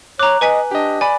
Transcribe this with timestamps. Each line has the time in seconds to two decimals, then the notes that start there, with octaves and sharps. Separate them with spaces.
0.19 C#5 A#5 D6 F#6
0.41 B4 D#5 G#5 B6
0.71 D4 G4 D#5
1.01 D5 G#5 B5